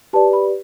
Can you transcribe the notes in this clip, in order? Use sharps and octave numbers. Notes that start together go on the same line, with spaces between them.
G4 B4 D5 A5
B5